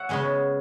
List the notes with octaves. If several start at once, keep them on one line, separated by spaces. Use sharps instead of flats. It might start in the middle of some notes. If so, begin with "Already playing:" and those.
Already playing: C#5 E5 F#5
C#3 G#3 B3 G#5